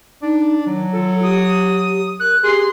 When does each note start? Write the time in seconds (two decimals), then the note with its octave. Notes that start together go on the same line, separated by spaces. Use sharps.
0.22 D4 D#4
0.67 D#3 F#3
0.93 F4 A4
1.23 G4 D#6
2.20 A#4 F#6
2.44 G4 G#4 C6